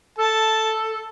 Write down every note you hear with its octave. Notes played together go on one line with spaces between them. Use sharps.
A4 A5